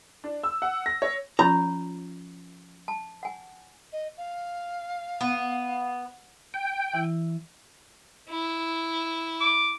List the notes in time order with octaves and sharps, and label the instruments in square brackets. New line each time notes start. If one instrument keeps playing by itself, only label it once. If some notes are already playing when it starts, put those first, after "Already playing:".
[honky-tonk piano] D4
E6
F#5
A#6
C#5
[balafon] F3 C#4 [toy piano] F4 C#5 [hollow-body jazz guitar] A#5
[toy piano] A5
F#5 G#5
[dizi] D#5
F5
[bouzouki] B3
[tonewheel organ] G5
[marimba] E3 E4
[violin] E4
[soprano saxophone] D6